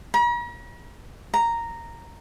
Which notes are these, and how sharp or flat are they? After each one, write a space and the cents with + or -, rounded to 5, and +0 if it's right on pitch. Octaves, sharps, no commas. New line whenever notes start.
A#5 +45
A#5 -5